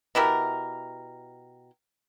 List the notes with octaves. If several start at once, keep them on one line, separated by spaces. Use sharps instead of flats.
B2 E4 G4 A#4